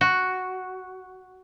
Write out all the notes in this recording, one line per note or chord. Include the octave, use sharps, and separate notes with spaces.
F#4